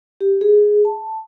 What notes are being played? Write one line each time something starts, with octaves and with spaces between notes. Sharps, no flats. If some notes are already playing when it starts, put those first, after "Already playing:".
G4
G#4
A5